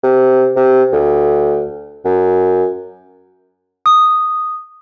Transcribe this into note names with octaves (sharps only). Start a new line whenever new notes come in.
C3
C3
D2
F#2
D#6